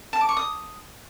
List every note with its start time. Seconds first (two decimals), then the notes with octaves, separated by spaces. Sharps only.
0.13 A5
0.21 D6
0.29 C#6
0.37 D#6